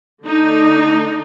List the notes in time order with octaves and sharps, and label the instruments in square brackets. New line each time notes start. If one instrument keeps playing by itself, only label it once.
[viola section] D3 A3 D4 D#4